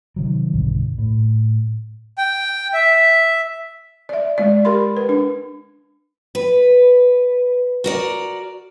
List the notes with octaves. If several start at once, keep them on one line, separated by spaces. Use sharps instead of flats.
C3 D#3 F#3
B1 G2 D3
A2
G5
E5
D5 E5
G#3 D5
G4 A#4 B5 C6
B4
D4
B4
F#4 A#4 D5